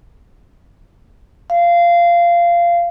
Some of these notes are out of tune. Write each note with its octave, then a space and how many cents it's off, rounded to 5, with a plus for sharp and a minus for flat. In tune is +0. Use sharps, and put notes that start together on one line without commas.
F5 -15